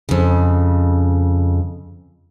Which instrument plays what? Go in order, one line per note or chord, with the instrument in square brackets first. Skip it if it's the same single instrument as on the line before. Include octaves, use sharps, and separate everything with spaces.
[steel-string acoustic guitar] F2 C#3